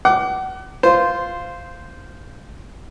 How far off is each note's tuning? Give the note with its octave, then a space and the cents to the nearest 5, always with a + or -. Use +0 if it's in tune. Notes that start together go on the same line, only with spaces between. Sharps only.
F#5 +35 D6 +0
F4 +0 C5 -10